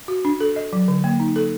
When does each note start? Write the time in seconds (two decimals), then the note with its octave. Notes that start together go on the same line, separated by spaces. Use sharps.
0.08 F#4
0.25 D4
0.40 A4
0.56 D#5
0.73 F#3
0.88 D3
1.04 A#3
1.20 D#4
1.36 A4